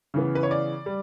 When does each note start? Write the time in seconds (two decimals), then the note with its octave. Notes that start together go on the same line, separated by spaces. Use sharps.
0.14 C#3 E3 B3
0.35 B4
0.43 C#5
0.51 D5
0.86 G3